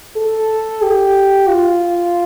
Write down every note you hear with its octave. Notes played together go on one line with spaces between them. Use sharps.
A4
G4
F4